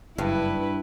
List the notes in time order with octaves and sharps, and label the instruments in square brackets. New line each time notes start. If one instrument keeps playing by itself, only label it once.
[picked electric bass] F#1 [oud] G2 [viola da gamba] E4 B4